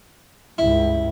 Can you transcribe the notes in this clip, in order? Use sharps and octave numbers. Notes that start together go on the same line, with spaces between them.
C#2 G2 E4